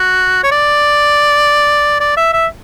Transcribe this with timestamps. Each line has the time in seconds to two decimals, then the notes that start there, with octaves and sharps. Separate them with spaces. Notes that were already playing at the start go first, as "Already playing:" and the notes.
Already playing: F#4
0.43 C#5
0.51 D5
2.01 D5
2.17 E5
2.33 E5